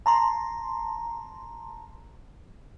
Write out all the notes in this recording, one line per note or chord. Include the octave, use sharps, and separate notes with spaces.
A5 A#5 C6